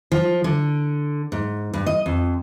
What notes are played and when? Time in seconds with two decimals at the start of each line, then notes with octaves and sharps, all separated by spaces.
0.12 F3
0.44 D3
1.32 G#2
1.74 G2
1.87 D#5
2.06 F2